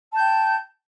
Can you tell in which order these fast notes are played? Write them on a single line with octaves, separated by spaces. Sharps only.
A5 G6 G5